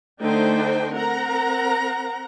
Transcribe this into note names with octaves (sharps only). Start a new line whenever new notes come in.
D3 A3 D4 D#4 C5 G5
C4 A#4 F#5 A#5